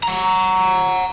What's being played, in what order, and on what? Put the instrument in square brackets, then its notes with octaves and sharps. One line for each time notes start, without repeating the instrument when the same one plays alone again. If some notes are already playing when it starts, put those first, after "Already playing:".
[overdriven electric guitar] F#5 A#5